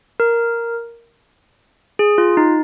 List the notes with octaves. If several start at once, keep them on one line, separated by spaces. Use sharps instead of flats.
A#4
G#4
F4
D#4